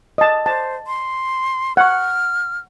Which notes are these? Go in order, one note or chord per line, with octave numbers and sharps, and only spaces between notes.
D#5 A5
C5 A5
C6
F#5 C#6 F6